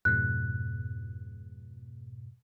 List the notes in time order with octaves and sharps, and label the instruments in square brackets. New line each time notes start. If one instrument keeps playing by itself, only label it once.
[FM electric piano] F2 G#2 B2 [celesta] F#6